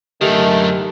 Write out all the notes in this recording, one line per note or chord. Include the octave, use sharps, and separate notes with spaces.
F#2 D3 D#3 A3 G4